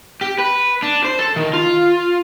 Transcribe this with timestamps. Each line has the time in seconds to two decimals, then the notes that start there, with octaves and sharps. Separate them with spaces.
0.21 G4
0.38 B4
0.82 D4
1.04 C5
1.19 A4
1.36 D#3
1.53 F4